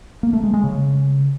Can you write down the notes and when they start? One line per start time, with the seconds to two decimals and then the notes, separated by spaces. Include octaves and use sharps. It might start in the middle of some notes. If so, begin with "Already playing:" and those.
0.23 A#3
0.33 A3
0.43 G#3
0.54 G#3
0.64 C#3